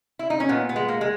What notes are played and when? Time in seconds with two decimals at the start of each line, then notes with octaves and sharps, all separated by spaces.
0.19 E4
0.30 D#4
0.40 C#4
0.49 A#2 B3
0.69 B3
0.76 G#3
0.88 A#3
1.01 G#3